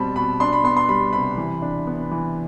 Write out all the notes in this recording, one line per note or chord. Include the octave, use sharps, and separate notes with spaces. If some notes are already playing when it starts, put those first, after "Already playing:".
Already playing: B2 G3 C4 A5 B5
B2 B5
D4 C6
B5
B3 C6
C6
G3 B5
C3 B5
E3
D4
B3
E3